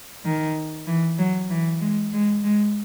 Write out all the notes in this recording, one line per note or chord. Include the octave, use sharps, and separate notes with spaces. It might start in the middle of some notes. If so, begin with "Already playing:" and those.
D#3
E3
F#3
E3
G#3
G#3
G#3